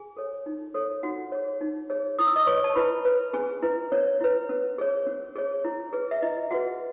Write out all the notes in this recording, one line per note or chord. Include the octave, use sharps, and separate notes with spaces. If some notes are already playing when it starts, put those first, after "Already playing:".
Already playing: G#4 G#5
A4 C#5
D#4
A4 C#5
D#4 F#4 F#5
G#4 C#5
D#4
G#4 C#5
E4 D#6
E6
D#5 D#6
B4 C#5 C#6
A5
E4 B4 B5
B4
C#4 G#4 G#5
E4 B4
C#4 C#5
E4 B4
C#4
G#4 C#5
C#4
G#4 C#5
E4
G#4 B4
E5
E4 D#5
F#4 G#4 B4 F#5